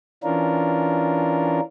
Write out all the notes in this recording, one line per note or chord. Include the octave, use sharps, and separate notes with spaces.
E3 C#4 D4 F4 A#4